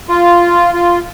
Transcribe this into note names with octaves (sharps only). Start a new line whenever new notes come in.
F4
F4